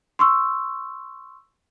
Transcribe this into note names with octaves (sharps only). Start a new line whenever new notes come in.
C6 C#6 E6